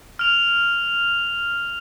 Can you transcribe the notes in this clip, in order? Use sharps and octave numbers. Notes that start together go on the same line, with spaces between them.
F6 F7